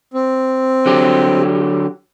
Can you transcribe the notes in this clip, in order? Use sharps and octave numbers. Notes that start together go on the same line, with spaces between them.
C4
D3 F#3 G4